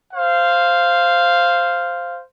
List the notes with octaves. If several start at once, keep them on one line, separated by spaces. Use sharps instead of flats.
C5 F5